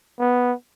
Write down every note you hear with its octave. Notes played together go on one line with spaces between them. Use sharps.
B3